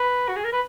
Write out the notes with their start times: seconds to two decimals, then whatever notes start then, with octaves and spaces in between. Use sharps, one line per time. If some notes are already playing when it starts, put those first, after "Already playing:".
Already playing: B4
0.28 F#4
0.36 G#4
0.44 A#4
0.53 B4